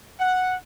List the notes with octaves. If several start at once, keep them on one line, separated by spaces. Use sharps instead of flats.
F#5